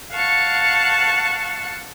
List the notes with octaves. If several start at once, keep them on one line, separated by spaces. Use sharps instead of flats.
F5 F#5 A5 C#6